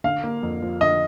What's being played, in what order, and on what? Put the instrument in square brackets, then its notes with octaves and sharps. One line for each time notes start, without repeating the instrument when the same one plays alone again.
[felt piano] D3 [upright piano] F5
[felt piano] A#3
F2
F3
[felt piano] D3 [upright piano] D#5